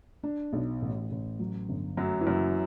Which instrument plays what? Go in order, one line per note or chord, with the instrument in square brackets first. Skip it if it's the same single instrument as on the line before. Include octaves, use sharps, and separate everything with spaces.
[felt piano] D4
B1
A1
A1
F#3
G1
[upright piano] F#2 F#3 [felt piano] A3
[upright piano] E3
[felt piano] F#1 [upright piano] F#2 F#3